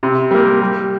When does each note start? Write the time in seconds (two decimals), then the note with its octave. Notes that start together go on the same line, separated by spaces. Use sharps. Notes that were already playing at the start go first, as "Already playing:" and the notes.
0.03 C3
0.31 G3 A#3
0.61 G3